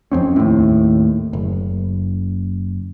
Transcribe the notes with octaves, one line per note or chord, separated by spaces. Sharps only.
F#1 F2 C4 C#4
D#2 A2
F#1